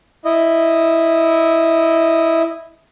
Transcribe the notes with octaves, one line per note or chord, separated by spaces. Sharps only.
E4 D#5